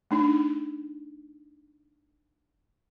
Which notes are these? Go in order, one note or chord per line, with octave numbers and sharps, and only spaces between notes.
A3 D4 D#4